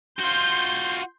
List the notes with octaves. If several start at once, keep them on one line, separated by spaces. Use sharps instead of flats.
F4 F#4 C6 G6